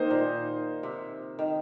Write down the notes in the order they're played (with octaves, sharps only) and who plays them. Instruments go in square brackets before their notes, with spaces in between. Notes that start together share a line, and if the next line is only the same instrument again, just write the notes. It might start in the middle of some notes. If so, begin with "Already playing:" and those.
Already playing: [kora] D#3 [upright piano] A#3 D#4 C5
[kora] A#2
C3
D#3